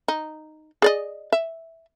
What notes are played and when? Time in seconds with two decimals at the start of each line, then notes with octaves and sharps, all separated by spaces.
0.08 D#4
0.82 G#4 D5 D#5
1.32 E5